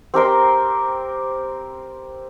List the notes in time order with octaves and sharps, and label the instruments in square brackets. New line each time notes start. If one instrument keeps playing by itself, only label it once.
[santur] C4 G4 A#4 C6